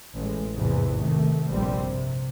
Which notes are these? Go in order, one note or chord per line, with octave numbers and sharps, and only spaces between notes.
A1 G#3
A#1 E2 G#2 C3 E3 G#3
C3 D#3 A3
F1 A#1 G2 G3 C4
C3